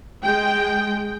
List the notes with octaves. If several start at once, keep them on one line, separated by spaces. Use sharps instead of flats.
G#3 G5